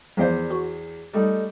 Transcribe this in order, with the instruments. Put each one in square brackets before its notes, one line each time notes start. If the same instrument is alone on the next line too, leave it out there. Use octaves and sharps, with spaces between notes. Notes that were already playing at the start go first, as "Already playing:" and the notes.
[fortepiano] E2 C5 [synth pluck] F3 B3 D5
[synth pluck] F#4
[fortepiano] G3 A3 D#4